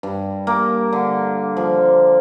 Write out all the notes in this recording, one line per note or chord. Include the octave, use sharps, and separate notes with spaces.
G2
A#3
D3
F3